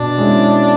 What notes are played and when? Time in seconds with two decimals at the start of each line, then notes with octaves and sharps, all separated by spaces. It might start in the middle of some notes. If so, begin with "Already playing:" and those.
Already playing: B2 D4
0.18 G#3 C#4 E4